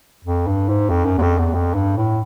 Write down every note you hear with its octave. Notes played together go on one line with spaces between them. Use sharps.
F2
G2
G#2
F2
F#2
E2
F2
E2
F2
G2
A2